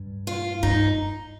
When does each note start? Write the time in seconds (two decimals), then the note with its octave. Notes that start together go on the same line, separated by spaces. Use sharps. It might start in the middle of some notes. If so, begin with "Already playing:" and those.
Already playing: G2
0.27 F4
0.63 G2 D#4